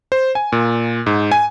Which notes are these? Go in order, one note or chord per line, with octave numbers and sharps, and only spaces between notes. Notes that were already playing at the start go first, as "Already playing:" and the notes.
C5
G#5
A#2
G#2
G#5